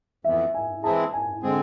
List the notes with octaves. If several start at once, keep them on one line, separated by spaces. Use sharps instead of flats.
F2 E3 B3 E5
G#5
E3 G#3 C4 E4 G#4 A5
G#5
D3 G#3 C4 G#4